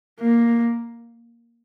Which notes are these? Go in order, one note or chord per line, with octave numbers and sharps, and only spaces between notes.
A#3